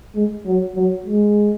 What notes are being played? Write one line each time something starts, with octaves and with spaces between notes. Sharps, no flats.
G#3
F#3
F#3
G#3